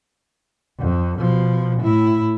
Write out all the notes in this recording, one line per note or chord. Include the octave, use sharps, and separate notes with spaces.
F2
B2 F3
A2 E4